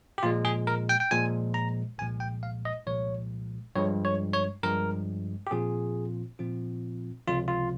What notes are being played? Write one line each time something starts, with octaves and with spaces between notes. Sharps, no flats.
G4
A#2 F3 G#3 F4
G#4
A#4
G5
G5
A#2 F3 G#3 G#5
A#5
C2 A#2 F3 G#3 G#5
G5
F5
D#5
C2 A#2 F3 G#3 C#5
G2 F3 G#3 C#5
C#5
C#5
G2 F3 G#3 A#4
G4
A#2 F3 C4 F4 G#4
A#2 F3 C4 F4
C#2 C3 F3 F4
F4